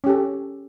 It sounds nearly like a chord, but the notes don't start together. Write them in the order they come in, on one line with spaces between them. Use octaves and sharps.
C#4 G4 A4